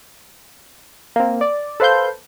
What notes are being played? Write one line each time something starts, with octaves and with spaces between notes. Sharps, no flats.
A#3 C4
D5
A4 B4 C5 F5 C6 G6